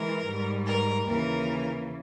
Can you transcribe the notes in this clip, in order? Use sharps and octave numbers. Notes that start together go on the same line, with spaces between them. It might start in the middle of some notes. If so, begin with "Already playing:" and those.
Already playing: E3 G#3 A#4
G#2 G3
A#4
D#2 C#3 E3 A#4